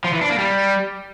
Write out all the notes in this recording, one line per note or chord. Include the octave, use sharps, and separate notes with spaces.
F3
E3
D4
A#3
G3